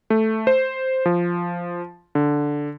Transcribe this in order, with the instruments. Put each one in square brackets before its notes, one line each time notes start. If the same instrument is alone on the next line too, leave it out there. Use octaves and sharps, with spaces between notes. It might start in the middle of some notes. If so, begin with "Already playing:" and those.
[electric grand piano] A3
C5
F3
D3